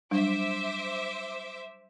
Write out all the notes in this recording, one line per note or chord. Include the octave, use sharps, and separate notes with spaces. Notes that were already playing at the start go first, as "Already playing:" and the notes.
F#3 G3 D4 C5 E5 D6